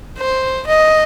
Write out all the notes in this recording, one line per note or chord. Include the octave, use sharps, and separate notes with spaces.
C5
D#5